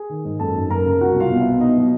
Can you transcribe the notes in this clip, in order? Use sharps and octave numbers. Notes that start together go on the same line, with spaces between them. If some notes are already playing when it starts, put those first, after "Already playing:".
Already playing: G#4 G#5
D#3
G#2
F#2 A4 A5
F#2
F#2 A#4 A#5
C#3
C2 F#4 F#5
C2 F4 F5
B2
E4 E5
B2
B2 D#4 D#5
F#3